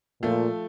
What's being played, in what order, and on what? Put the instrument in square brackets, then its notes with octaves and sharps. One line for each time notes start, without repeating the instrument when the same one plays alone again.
[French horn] A#2 [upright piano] F3 A3